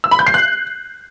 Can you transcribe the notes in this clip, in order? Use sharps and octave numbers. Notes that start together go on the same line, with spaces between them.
E6
B5
G6
C7
F#6